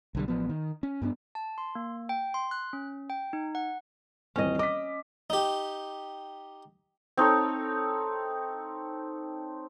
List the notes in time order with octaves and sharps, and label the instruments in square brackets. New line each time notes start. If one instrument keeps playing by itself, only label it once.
[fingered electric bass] B1 D3 G3
A1 F3 B3
D#3
C#4
G2 B3 D4
[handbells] A5
C6
A#3
G5
C6
F#6
C#4
G5
D#4
F#5
[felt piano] D#1 E3 C4 [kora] C#4 D#5
[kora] D#5 [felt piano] D6 B6
[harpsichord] D#4 G4
[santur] C4 D#4 A4 C#5